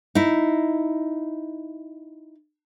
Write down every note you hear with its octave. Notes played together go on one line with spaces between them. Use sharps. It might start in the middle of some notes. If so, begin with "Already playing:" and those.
D#4 E4